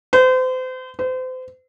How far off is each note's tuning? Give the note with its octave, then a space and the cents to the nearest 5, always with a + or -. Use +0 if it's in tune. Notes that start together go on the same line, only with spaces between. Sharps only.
C5 -35
C5 -35